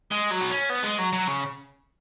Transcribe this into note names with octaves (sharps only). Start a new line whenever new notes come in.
G#3
F#3
B3
C#4
B3
G#3
F#3
F#3
C#3